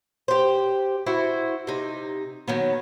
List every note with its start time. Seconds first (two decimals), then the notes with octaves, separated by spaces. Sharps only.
0.28 G4 C5
1.06 E4 F#4 C5
1.67 C3 D#4
2.48 D#3 F#3 B3